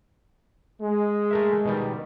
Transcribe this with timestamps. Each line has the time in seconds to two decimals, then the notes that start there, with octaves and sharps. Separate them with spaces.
0.82 G#3
1.31 A3 A#4 E5
1.65 B2 D#3 G3